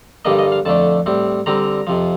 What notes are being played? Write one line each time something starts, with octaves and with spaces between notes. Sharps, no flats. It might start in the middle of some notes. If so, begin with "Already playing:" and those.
G2 D3 G3 A#3 D4 D#5
D#5
F5
F2 D3 A3 D4 A5
A2 G3 C4
D3 G3 C4 A#5
F2 C3 F3